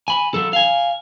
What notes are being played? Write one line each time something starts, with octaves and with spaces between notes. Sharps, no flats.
G#5 B5
F#3 A4
F5 G#5